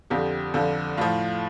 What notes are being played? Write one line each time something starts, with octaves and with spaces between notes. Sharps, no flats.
F2 D3 F3 G4
F2 D3 F3
A2 F3 F4